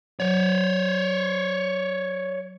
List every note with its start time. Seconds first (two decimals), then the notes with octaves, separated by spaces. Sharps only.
0.20 F#3 C#5 D5